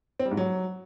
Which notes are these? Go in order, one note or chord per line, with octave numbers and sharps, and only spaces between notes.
C4
G3
G#2
F#3